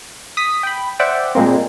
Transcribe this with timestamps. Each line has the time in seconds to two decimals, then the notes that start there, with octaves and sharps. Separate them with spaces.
0.37 D#6 B6
0.63 G5 B5
1.00 C5 D5 E5 F#5 G5
1.35 A#2 G3 G#3 A#3 C4